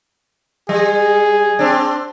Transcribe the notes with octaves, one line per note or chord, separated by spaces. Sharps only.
G3 G#4
C4 D4